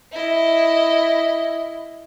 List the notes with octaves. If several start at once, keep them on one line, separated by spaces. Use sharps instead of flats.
E4 D#5